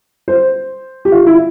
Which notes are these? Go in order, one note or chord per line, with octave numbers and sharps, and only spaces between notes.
C5
G4
F4
E4